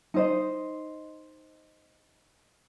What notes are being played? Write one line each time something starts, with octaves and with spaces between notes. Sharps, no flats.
D#4 C5 D#5